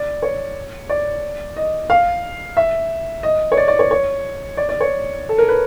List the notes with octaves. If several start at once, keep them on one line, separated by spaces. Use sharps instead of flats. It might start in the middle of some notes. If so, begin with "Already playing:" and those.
Already playing: D5
C#5
D5
D#5
F5
E5
D#5
C#5
D5
D5
C#5
C#5
D5
D5
C#5
A4
A#4
B4